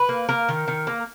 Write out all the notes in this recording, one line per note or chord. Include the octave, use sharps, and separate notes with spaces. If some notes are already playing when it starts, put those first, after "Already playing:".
Already playing: B4
A#3
A#3 A#4
D#3
D#3
A#3